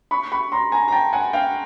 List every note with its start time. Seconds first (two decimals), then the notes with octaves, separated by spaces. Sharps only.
0.11 B5 C#6
0.32 B5 C#6
0.52 A#5 C6
0.72 G#5 A#5
0.88 A#5
0.92 G5 A5
1.13 F#5 G#5
1.33 F5 G5